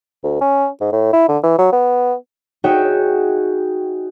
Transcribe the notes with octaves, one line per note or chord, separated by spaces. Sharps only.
D2
C#4
G#2
A2
E4
D3
E3
F#3
B3
D#4 F#4 G#4 C#5 E5 G5